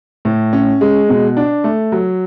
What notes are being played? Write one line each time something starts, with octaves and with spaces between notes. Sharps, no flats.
A2
C#4
G#3
B2
D4
A3
F#3